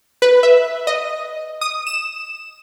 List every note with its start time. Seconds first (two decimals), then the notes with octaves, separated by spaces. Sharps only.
0.22 B4
0.43 E5
0.87 D#5
1.61 D#6
1.87 E7